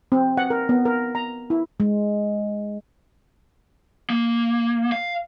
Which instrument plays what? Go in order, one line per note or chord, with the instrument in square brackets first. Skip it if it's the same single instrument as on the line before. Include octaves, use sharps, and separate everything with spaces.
[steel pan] C4
F#5
A#4
B3
A#4
A#5
E4
[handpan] G#3
[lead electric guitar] A#3
F5